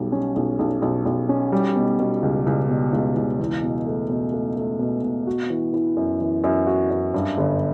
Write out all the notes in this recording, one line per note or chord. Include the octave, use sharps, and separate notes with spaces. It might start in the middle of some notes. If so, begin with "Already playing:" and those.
Already playing: B1 G3
C#4
B1
B1
B1
B1
C#4
G3
B2
B2
C#2
C#2
B2
C#2
C#2
E2
B2
A3
B2
A3
A3
B2
B2
F#4
E3
E3
F#2
E3
F#2
F#4
F#2
G2
G1